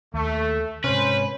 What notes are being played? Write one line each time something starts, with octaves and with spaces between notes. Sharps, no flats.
D#2 A3
G#2 C3 C#4 B4 C5